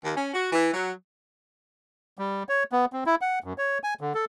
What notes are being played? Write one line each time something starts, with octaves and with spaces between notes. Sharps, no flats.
D#2
C#4
F#4
E3
F#3
G3
C#5
B3
C4
E4
F#5
F#2
C#5
G#5
D3
A4